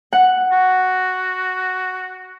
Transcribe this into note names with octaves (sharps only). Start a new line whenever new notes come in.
F#5
F#4